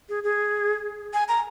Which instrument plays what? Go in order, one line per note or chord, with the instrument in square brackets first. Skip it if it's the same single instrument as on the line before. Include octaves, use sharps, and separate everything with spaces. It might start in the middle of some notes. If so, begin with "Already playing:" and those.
[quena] G#4
G#4
G#5
A#5